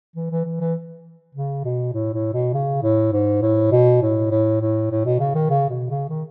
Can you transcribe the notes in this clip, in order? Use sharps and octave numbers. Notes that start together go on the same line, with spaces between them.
E3
E3
E3
E3
C#3
B2
A2
A2
B2
C#3
A2
G#2
A2
B2
A2
A2
A2
A2
B2
C#3
D#3
C#3
B2
C#3
D#3